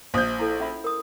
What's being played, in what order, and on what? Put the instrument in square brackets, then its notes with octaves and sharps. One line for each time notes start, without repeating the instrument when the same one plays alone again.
[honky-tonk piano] A#1 G6 [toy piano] C5 D#5 D#6
[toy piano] E4 A4
C#4 E5 B5
A#4 D#6